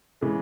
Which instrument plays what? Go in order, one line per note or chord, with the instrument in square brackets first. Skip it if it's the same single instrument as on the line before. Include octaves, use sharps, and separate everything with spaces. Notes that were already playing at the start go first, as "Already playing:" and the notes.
[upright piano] C#3 E3 G#3